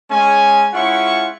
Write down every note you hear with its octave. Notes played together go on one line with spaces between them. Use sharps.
G#3 C#4 G#5
G#3 C#4 E4 F4 F#5 C#6